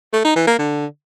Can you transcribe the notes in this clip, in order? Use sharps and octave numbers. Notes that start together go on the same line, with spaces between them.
A3
D#4
E3
A#3
D3